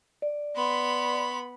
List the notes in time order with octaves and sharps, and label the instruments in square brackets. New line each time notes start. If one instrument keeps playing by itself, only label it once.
[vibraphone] D5
[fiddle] B3 B5 [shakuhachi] C6